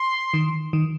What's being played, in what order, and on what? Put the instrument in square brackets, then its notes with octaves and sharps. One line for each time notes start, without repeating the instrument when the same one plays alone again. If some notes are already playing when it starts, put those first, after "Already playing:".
Already playing: [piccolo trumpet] C6
[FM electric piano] D#3
D#3